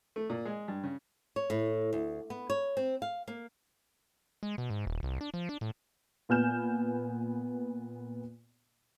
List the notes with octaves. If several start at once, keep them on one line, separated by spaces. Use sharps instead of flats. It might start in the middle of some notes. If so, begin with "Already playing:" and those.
A3
A#2
G#3
G2
C#3
C#5
A2
D2
B3
C#5
C4
F5
A#3
G#3
B2
G#2
D#1
C2
D4
F3
D4
A2
A#2 B3 G#5 F6 G6 E7